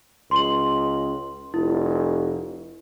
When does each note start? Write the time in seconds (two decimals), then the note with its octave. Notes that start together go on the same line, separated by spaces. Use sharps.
0.31 C#2 C6 F#7
1.54 F1 E4